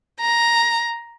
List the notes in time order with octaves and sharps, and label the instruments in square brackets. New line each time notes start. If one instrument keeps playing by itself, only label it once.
[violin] A#5